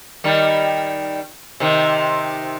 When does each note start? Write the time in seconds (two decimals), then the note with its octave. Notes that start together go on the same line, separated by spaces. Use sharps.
0.24 D#3 G3
1.60 C3 D#3